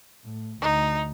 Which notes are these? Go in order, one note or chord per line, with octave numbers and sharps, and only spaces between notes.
A2
D2 D#4